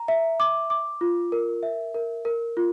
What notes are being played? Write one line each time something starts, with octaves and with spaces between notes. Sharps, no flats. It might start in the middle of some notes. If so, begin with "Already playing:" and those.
Already playing: A#5
E5
D6
D6
F4
A#4
E5
A#4
A#4
F4